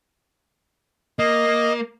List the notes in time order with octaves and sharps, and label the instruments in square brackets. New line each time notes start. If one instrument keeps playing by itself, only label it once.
[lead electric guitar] A#3 [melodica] D#5